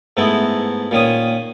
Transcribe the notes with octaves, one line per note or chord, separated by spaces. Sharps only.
G#2 A3 B3 D#4 E4
A#2 D#3 C#4 D#6